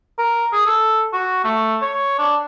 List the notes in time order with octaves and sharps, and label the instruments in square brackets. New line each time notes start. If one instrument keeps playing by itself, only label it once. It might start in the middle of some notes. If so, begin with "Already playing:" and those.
[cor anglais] A#4
G#4
A4
F#4
A3
C#5
D4